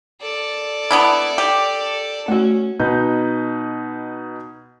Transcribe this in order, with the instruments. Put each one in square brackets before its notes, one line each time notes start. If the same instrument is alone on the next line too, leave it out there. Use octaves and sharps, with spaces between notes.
[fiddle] A4 D5
[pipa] B3 D4 E4
G4
[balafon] A3 F#4 [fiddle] C#4
[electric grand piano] B2 D#4 B4 G6